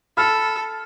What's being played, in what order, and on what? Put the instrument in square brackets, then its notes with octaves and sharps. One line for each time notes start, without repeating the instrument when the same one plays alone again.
[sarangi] A4 [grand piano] B5 E6 F6